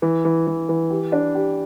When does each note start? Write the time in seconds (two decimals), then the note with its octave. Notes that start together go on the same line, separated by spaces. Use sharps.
0.02 E3
0.25 E3
0.47 E3
0.69 E3
0.90 G4
1.12 D4
1.35 G4